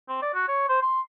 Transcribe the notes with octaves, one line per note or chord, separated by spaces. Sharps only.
C4
D5
F#4
C#5
C5
C6